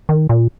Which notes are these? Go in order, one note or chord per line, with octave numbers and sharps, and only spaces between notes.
D#3
A#2